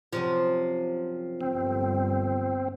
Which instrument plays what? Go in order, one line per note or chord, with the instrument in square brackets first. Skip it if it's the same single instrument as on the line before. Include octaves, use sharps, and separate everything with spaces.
[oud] F#2 C3 F3
[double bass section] G1 [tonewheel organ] C4